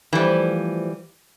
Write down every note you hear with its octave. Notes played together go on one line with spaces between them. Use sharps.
E3 F3 G3 A3